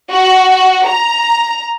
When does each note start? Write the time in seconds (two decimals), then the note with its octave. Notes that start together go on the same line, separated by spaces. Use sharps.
0.11 F#4
0.87 A#5